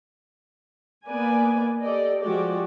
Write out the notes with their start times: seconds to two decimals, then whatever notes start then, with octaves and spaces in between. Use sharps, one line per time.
1.07 A#3 B3 B4 D5 G#5
1.83 G4 A4 D5 D#5
2.22 F3 G#3 F#4 G4 A4 D5